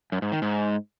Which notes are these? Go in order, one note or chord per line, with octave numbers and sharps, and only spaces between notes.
F#2
G#2
D#3
G#2